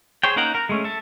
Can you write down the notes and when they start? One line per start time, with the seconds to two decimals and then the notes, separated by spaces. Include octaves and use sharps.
0.24 G#4 C5 C#5 G5
0.36 A#3 C#4 D#4 A#4 F#5
0.55 A#4
0.69 G#3 A3 C#4
0.84 A4 E5